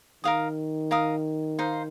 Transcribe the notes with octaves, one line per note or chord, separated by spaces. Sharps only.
D#3 A#4 F5 D#6
A#4 F5 D#6
D#4 C5 F5